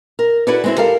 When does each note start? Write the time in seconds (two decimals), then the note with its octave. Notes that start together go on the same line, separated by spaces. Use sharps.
0.19 A#4
0.47 E4 F#4 A4 B4 C#5 D5
0.64 G#3 C4 E4
0.77 G4 A4 A#4 F5